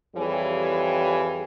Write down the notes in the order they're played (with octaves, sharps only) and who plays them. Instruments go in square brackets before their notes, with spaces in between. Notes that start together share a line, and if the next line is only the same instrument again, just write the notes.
[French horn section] F2 E3 G3 G4 G#4 C#5